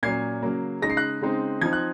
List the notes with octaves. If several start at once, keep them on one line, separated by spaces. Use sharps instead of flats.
A#2 F#3 C#4 G#6 C7
C#3 F#3 A#3
C#3 G#3 D#4 A#6
C7
F#6 A#6
C#3 G#3 C4 D#4
F3 C4 D#4 G#6
F#6